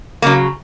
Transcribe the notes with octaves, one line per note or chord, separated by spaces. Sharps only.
C#3 F#3 A#3